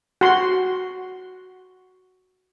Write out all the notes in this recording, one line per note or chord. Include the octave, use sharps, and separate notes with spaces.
F#4 C6